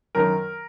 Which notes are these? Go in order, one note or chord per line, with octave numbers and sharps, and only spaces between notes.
F#2 D#3 F#3 A#4